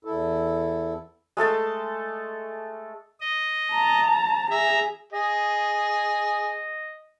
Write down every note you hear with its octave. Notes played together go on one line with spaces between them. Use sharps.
E2 E4 A4
G#3 A3 A4 A5
D#5
A5 A#5
G#4 E5 A#5
G#4 D#5